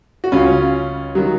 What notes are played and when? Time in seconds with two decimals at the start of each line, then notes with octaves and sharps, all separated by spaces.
0.24 F#4
0.32 C#2 C#3 C#4 F4
1.15 D#3 F#3